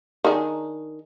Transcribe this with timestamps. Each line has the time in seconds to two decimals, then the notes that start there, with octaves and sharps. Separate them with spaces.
0.24 D#3 D4 G#4